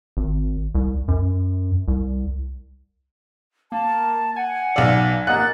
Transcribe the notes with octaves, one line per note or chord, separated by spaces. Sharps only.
G#1
C2
F#2
C2
A#3 A5
F#5 G#5
B1 D5 F5 E6
A#3 D#5 F#5 F#6 A6